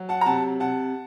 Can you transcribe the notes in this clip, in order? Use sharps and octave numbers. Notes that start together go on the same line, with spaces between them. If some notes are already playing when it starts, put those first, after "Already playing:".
Already playing: F#3
F#5 A5
A#5
C3 F#5 A5
C3 F#5 A5